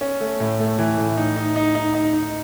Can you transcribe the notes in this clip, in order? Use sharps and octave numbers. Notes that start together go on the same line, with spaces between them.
C#4
A3
A2
A3
E3
A2
D#4
D#4
D#4
D#4
D#4
D#4